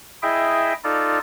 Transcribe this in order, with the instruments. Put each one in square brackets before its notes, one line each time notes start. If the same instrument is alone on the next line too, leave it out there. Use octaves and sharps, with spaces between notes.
[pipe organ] E4 G#4 D#5 E5 G5
D#4 F4 A4 D5